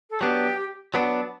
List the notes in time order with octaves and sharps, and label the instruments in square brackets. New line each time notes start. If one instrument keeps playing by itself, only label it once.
[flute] A4
[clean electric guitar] F#3 B3 D4 [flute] G4
[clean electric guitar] F#3 B3 D4